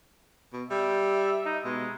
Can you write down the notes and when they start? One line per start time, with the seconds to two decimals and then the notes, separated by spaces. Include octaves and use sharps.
0.53 B2
0.70 G3 E5
1.45 D#4
1.65 B2 G#3